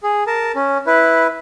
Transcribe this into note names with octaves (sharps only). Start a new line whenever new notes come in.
G#4
A#4 A5
C#4
E4 B4